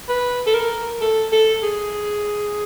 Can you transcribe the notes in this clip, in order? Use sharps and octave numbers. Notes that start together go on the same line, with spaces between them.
B4
A4
A#4
A4
A4
G#4